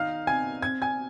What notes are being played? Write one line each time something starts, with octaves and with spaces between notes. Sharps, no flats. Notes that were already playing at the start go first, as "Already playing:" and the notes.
Already playing: D#3 D#4 F5 F6
C4 G#5 G#6
C4 G#6
G#5 G#6